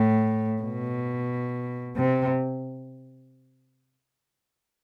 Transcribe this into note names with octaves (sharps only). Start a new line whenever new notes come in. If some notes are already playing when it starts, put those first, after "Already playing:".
Already playing: A2
B2
C3